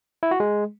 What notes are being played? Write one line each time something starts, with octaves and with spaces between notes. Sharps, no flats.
E4
F#4
G#3